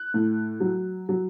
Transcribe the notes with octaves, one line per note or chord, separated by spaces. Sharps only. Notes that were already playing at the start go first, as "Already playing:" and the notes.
Already playing: F#6
A2
F#3
F#3